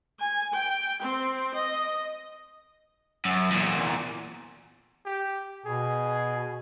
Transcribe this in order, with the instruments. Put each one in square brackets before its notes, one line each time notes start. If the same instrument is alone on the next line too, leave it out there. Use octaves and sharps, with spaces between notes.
[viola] G#5
G5
C4
D#5
[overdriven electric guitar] F#2
E2 A#2
[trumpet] G4
[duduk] B2 [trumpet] G#4